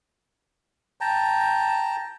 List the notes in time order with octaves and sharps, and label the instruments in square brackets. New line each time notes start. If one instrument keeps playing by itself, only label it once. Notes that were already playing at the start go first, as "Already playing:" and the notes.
[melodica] G5 A5 A#5